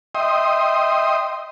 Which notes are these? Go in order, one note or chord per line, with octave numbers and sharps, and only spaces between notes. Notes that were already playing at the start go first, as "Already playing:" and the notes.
D#5 E5 G5 C6 D#6